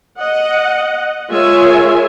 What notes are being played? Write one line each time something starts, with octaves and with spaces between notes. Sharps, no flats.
D#5 F#5
G#3 F4 A#4 C#5 E5 G#5